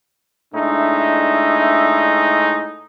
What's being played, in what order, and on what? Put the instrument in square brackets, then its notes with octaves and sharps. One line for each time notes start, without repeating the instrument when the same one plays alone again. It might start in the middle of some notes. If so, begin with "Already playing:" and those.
[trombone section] A2 G#3 D#4 [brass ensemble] D4 E5